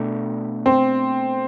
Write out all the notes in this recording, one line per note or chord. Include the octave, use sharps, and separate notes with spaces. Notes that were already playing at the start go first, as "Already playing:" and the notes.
Already playing: B2 A3 D4
C4